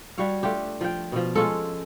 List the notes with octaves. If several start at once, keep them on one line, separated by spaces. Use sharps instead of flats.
G3 F#4 C#5 F5
A3 D4 F4 G4
F3 G5
B2 F3
G#3 C#4 F4 A4